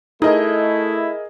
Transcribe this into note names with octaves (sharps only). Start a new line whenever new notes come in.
A3 D#4 E4 G#4 A#4 D#5